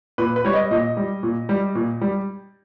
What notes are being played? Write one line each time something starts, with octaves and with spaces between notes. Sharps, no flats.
A#2 B4
B4
G3 C#5
D#5
A#2 D#5
G3
A#2
G3
A#2
G3